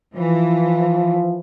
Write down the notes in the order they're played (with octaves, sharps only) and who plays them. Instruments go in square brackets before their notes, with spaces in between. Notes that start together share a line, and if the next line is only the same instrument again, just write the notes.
[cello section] E3 [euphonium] F3